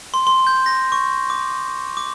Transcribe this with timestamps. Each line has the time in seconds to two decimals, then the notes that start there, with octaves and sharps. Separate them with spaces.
0.14 C6
0.27 C6
0.47 G6
0.66 A#6
0.92 C#6
1.30 D6
1.97 D6